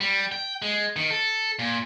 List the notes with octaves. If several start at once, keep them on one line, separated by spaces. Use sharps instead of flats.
G3
G5
G#3
D#3
A4
A#2